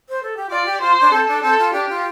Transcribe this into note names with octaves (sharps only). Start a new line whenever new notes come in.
C5
A4
G4
F4 D5
G4
F4 C5
D4
C4 A4
D4
C4 A4
F4
D4 G4
F4